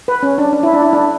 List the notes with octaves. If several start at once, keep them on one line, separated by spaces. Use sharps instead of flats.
B4
C#4
D4
D4
E4
D4
E4
D4